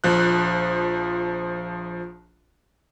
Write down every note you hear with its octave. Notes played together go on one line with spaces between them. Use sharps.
A#1 F3 F#6